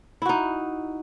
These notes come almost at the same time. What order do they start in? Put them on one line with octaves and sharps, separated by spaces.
E4 F#4 D#4